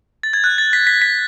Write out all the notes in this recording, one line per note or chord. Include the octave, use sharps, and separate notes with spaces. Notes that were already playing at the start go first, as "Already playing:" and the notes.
A6
G#6
F#6
A6
B6
B6
B6